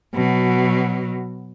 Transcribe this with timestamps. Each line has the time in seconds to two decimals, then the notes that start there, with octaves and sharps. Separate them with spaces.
0.15 B2 F#3